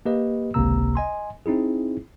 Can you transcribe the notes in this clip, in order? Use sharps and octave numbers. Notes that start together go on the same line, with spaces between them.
A#3 G4 B4 D#5
G#1 C#2 C3 A#3 A#5 E6
D#5 G#5 C6
C4 D#4 E4 G#4